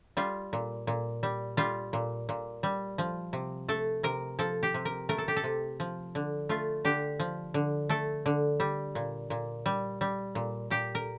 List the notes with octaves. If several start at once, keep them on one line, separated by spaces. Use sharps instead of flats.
G3 F4
A#2
A#2
G3
G3 F4
A#2
A#2
G3
F3
C3
A3 A4
C3 A#4
F3 A4
G4
C3
A#4
A3 A#4
A4
G4
A4
C3
F3
D3
A3 F4
D3 G4
F3
D3
A3 A4
D3
G3
A#2
A#2
G3
G3
A#2
A#2 G4
A#4